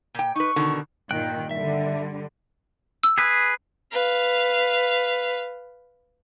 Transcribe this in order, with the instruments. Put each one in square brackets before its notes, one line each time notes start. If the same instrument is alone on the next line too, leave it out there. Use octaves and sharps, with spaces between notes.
[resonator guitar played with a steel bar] A#2 G5
[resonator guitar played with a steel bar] D#4 B4 [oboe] C#6
[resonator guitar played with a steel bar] B2 D3 D#3
[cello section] G2 A#2 D#3 [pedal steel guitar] G5 F#6
[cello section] D3 G3 [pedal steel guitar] E5
[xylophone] E6
[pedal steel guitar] G#4 B4
[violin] B4 F5